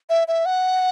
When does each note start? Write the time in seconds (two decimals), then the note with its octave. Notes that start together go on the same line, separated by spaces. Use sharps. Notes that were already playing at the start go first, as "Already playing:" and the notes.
0.10 E5
0.28 E5
0.45 F#5